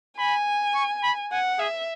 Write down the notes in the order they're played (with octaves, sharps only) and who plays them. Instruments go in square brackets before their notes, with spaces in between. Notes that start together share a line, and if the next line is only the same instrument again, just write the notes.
[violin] G#5 [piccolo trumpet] B5
[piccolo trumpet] C#6
B5
[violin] F#5 [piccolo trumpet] G#5
[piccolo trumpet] G#4 [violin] E5